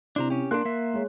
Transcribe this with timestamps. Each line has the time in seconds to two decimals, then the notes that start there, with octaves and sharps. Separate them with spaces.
0.16 C3 D4 E4 C5 A#5
0.30 C#4 G4
0.51 A#3 D4 A#4 C6 F#6
0.65 A#3 E5
0.94 G#3 C#5